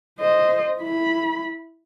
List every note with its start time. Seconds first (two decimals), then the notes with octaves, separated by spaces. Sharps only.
0.19 C5 D#5
0.78 E4 B5